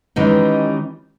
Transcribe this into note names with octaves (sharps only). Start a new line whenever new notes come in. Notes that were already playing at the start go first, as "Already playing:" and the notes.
D#3 E3 G3 G#3 C#4 D#4